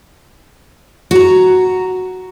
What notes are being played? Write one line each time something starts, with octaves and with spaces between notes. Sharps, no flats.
F#4 A#5